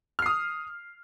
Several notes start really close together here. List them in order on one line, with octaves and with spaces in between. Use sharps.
F6 C7 D#6